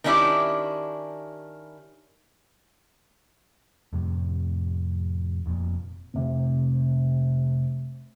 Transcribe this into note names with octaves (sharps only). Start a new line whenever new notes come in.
D#3 C#4 D4 E4 G4
F2 A2 C3
F1 F2 A#2
F1 C3